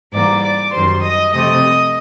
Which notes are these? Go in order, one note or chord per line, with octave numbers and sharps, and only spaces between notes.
G#2 E3 G3 A#3 D5 D6
D5 D6
F#2 D#3 G3 C5 C6
D#5 D#6
C3 F3 A3 C4 D#5 D#6